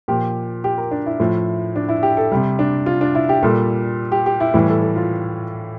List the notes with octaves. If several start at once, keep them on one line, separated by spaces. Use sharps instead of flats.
A#2 F3 G4
G4
A#4
D4
E4
A2 F3
D4
E4
G4
A4
C3 G3
D4
F4
D4
E4
G4
A#2 G3 A4
G4
G4
E4
A2 E3 G3
A4
A4
F4